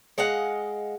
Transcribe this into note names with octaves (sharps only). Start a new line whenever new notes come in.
G#3 D#5 F5 F#5